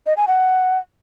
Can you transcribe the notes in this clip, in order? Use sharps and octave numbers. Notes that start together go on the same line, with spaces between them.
D#5
G#5
F#5